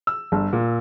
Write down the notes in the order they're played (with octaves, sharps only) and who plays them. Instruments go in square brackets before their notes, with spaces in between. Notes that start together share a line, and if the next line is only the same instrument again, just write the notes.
[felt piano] E6
G1
A#2